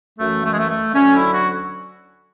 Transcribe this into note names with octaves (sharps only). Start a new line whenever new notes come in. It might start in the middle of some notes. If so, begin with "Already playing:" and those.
F#2 E3 A3
A3
G#3
A3
A3
D2 D3 F#3 C#4
E4
F#4